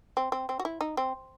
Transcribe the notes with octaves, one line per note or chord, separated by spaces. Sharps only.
C4
C4
C4
F#4
E4
D#4
C4